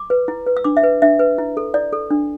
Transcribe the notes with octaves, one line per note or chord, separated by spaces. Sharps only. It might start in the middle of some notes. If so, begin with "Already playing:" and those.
Already playing: D6
B4
E4
B4
E6
D4 D6
E5
B4
D4 E5
B4
E4
A4
E4 D5
A4
D4